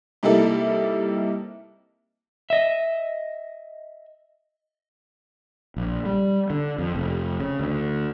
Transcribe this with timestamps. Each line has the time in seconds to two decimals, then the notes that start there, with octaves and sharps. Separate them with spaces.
0.23 C3 G3 A#3 D#4 E4 A4
2.50 D#5 E5
5.77 A#1
6.06 G3
6.50 D3
6.78 F2
6.95 F1
7.40 C#3
7.60 D2